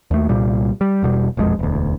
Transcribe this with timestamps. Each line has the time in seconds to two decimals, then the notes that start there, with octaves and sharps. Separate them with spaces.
0.11 D#2 A3
0.29 C2 A#2 G3
0.81 G3
1.03 E1 B2 G3
1.37 E1 A#1 F2 G#3
1.59 E1 D2